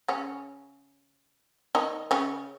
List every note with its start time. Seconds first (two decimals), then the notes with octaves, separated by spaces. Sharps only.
0.08 C#3 C#4
1.75 D#3 D#4
2.11 C#3 C#4